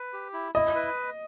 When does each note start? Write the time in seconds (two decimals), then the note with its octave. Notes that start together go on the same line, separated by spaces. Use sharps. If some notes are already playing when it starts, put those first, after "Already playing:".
Already playing: B4
0.13 G4
0.33 E4
0.55 E4 D#5
0.75 B4